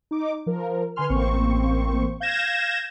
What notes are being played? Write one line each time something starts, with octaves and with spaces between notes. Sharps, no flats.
D#4 D6
F3 A#4
D3 B4 G#5 C6 F6
A1 A#3 C4 C5 C#6
F5 G6 G#6 A#6 E7